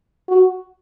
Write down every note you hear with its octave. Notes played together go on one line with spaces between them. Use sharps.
F#4